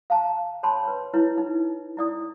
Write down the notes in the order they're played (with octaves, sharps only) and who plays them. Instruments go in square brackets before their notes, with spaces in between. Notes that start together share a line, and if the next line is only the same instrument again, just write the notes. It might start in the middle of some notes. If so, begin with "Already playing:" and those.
[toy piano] F5 A5 A#5
C#5 A5 B5 C6
B4 C#5
E4 B4 C#5
D#4
E4 D5 D#6